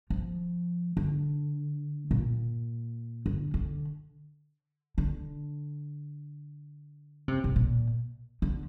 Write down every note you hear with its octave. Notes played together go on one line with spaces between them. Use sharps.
F3
D3
A#2
D3
D3
D3
C3
C3
A#2
D3